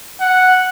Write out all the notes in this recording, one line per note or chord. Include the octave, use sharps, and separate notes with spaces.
F#5